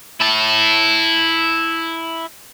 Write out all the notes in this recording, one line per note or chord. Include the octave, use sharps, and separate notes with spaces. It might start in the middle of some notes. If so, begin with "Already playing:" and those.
E4 A5